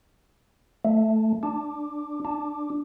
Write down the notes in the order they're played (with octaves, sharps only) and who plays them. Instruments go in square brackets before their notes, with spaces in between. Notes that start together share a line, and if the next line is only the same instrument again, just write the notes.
[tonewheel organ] A3
D4
D4